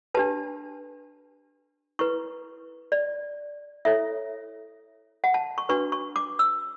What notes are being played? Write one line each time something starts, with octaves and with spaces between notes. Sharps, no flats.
D4 G4 B4 A5
E4 B4 C#6
D5
E4 A4 C#5 E5
F#5
A5
C#6
D4 F#4 B4 C#6
C#6
D6
E6